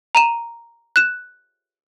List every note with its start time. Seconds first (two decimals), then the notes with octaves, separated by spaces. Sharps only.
0.15 A#5 D#7 E7
0.96 F#6 E7